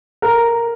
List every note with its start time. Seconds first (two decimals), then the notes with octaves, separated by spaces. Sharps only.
0.22 A#4